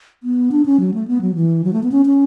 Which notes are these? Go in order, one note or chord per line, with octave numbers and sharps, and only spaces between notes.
B3
D4
C#4
F#3
A3
B3
F#3
E3
F#3
A3
B3
C#4
C#4